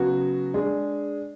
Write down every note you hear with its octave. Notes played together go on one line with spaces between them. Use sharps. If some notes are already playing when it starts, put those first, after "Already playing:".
Already playing: C#3 F#3 B3 F#4
G#3 D4 G#4